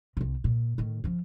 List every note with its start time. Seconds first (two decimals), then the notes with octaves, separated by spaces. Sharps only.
0.17 C2 C3
0.44 A#2
0.78 A2 D#3
1.04 F3 C#4